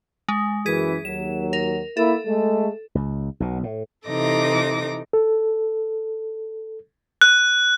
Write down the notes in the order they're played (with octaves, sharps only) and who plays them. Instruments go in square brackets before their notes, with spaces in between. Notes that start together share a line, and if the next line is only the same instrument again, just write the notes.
[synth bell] G#3
[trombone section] F#2 E3 [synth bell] G#4 B6
[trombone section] D#2 F#3 [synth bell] E7
[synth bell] A#4
[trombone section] A#3 E4 [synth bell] A4
[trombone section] G#3 A3
[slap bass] C#2
B1 B2
A2
[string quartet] C3 E3 D#4 A4 D6 A#6
[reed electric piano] A4
[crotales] F#6